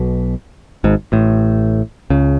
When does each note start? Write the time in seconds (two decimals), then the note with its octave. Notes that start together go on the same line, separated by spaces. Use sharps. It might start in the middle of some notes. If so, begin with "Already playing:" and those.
Already playing: B1 B2
0.84 G#1 G#2
1.12 A1 A2
2.10 C#2 C#3